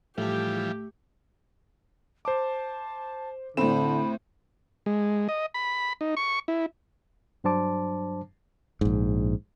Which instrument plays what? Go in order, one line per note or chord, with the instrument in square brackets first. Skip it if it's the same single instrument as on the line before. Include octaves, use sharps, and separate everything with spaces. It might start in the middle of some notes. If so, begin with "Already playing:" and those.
[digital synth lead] A2 [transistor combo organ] E3 F3 G3 [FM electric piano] A3 A4 [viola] G4
[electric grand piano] C5 D6 [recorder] A5
[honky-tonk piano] A2 C4 [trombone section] D3 [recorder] B5 [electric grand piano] E7
[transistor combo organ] G#3
D#5
B5
D#4
C#6
E4
[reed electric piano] G2 F#3 D4 C5 A5 D6
[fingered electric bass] A#1 G#2